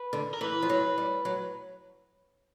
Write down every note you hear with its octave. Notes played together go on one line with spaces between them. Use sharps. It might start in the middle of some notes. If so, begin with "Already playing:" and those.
Already playing: B4
D3
A#4
E3 B4
F3
F#3
G3
F#3